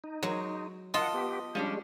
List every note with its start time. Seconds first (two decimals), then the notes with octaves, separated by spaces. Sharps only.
0.04 D#4
0.23 F#3 G#3
0.94 F4 D#5 F#5 A5
1.14 B3 G4
1.55 F3 G3 G#3 C#4 D4